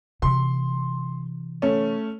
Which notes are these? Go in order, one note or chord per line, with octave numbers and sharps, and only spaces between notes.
C3 E3 C6
A3 C#4